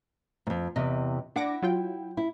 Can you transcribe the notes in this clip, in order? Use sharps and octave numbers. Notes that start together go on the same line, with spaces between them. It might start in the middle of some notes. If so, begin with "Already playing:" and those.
F2 G#2
E2 C3 D#5
D4 E4 F#5 D6 A#6
F#3 F4 G5
E4